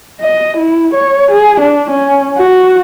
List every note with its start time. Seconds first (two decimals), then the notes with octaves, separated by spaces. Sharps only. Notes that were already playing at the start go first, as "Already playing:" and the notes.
0.21 D#5
0.58 E4
0.94 C#5
1.32 G#4
1.61 D4
1.91 C#4
2.38 F#4